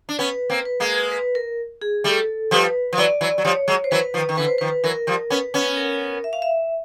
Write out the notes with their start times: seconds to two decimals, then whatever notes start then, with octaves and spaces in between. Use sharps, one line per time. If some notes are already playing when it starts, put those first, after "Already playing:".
0.09 D4
0.19 B3 C#4 B4
0.50 A#3 C4
0.65 B4
0.80 G#3 A#3
1.11 B4
1.35 A#4
1.82 G#4
2.04 G3 A3 A4
2.51 F3 G3 B4
2.93 F3
2.98 E3 F#3 D5
3.21 E3 F#3
3.38 F#3
3.45 F3 G3 C#5
3.68 F#3 G#3
3.84 C5
3.91 E3 F#3 B4
4.14 D#3 F3
4.29 D#3
4.37 D3 E3 B4
4.48 C5
4.58 D#3 F3 B4
4.84 E3 F#3 A#4
5.07 F3 G3
5.30 B3 C#4 B4
5.54 B3 C#4
5.77 A#4
6.24 E5
6.33 F5
6.42 E5